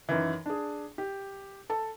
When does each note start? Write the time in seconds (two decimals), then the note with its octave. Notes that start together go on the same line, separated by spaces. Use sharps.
0.09 F#2 D#3 E3
0.46 D4 G#4
0.98 G4
1.70 A4 A5